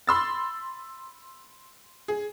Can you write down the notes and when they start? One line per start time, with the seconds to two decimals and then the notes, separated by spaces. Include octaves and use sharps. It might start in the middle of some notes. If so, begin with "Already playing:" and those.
0.07 B5 C6 E6 A6
2.08 G#4